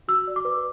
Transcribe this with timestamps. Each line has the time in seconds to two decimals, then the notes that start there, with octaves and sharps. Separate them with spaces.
0.08 F#4 E6
0.27 D5
0.36 D6
0.45 B4